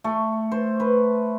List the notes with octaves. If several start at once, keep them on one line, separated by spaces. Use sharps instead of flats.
A3
C5
B4